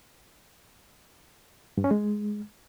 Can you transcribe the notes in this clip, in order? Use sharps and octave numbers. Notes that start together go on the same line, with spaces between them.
G2
C#4
G#3